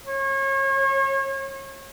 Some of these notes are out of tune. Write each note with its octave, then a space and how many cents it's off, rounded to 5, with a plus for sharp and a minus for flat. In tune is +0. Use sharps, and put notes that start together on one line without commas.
C#5 -35